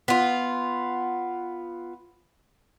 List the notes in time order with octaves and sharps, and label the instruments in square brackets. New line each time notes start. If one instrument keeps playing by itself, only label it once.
[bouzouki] B3 F4